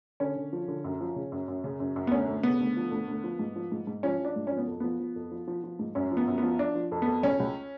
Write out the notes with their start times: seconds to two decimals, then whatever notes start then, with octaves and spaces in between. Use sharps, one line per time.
0.20 D3 C#4
0.36 D3
0.53 F3
0.68 D3
0.84 F#2
1.01 F3
1.16 C#3
1.32 F#2
1.48 F#2
1.64 C#3
1.80 F#2
1.96 F#2
2.07 B3
2.12 D2 C#4
2.28 D2
2.43 C#3 B3
2.60 D2
2.77 F3
2.91 D2
3.08 D2
3.24 F3
3.39 G#2
3.56 F3
3.72 G#2
3.87 G#2
4.03 F3 C#4
4.20 F3 D4
4.36 G#2
4.47 F3 C#4
4.57 B3
4.67 F2
4.80 F3 B3
5.00 F3
5.16 F2
5.32 F3
5.48 F3
5.64 F3
5.79 G#2
5.95 F#2 C#4
6.12 F3
6.17 B3
6.28 F#2
6.38 B3
6.43 F3
6.59 F3 D4
6.75 F3
6.92 F2
7.02 B3
7.07 F2
7.23 C#2 C#4
7.40 C#2